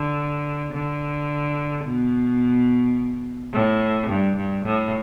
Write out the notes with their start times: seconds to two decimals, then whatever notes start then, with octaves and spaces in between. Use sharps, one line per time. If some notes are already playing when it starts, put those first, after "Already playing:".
Already playing: D3
0.73 D3
1.85 B2
3.53 A2
4.09 G2
4.37 G2
4.65 A2